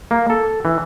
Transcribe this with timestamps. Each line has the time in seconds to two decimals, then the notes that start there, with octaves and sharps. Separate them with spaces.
0.11 A#3
0.30 A4
0.65 E3